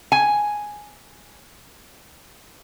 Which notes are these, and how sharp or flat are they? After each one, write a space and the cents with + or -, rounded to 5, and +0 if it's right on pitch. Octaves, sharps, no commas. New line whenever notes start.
G#5 +0